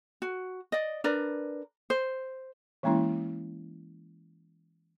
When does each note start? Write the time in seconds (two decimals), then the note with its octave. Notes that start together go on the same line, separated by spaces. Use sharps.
0.22 F#4
0.72 D5 D#5
1.04 D4 A#4 B4 D5
1.90 C5
2.83 E3 G#3 A#3 C#4 E4